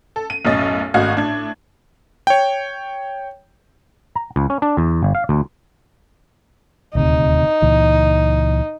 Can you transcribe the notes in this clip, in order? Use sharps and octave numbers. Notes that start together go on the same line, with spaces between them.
A4
D#7
B1 F#2 A2 C#4 D#5 A6
G#1 A3 F#4 D#5 F5 G#6
A2 D4 G#6
C#5 G5
A#5
C#2
C#4
D4
E2
G1
F5
D2
D#1 D2 C3 D#4
C#2 A#2 E3